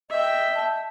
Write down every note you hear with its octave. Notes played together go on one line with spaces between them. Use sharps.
D#5 E5 G5
A5